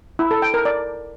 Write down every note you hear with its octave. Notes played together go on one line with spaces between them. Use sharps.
E4
A4
G5
A#4
D5